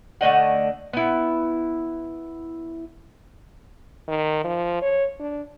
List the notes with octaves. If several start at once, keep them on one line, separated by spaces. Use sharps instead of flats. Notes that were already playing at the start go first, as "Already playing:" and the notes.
D3 A3 D#5 F#5
B3 E4
D#3
F3
C#5
D4